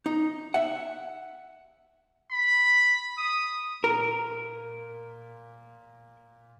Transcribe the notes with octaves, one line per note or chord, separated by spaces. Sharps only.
D#4
E5 F#5
B5
D#6
A#2 A#4